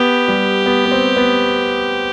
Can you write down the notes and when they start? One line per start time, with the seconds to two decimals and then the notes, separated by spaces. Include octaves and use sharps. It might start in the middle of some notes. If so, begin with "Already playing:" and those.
Already playing: B3 G4
0.28 G3
0.66 B3
0.85 B3
0.92 C4
1.17 B3